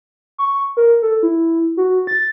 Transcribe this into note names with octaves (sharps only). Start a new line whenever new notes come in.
C#6
A#4
A4
E4
F#4
A6